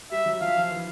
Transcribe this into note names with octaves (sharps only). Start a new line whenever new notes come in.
G3 E5
F#3
F3 F5
F3
E3